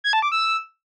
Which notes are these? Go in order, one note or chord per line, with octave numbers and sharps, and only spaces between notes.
G#6
A5
D6
E6